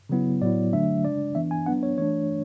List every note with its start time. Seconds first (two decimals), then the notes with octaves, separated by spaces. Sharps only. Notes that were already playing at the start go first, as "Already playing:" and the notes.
0.09 C#3 F#3 B3 E4
0.42 A2 F#3 B3 E4 D5
0.73 D3 F#3 A3 D4 E5
1.05 C#3 G#3 D4 D5
1.35 E3 B3 D4 E5
1.51 G#5
1.66 F#3 B3 D4 F#5
1.83 C#5
1.98 E3 A3 D4 C#5